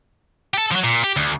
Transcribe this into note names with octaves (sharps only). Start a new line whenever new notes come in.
G4 A4
F3 F#3
A#2
G4
D2